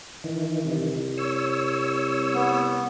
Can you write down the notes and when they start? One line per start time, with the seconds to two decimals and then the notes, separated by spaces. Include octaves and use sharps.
0.24 D#3 E3
0.65 C2
1.18 C#5 E6
2.35 B3